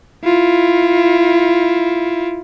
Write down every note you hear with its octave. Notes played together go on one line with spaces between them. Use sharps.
E4 F4